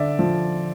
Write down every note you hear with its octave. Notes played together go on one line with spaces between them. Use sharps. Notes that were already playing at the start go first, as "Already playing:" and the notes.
Already playing: D3 D5 E5
F3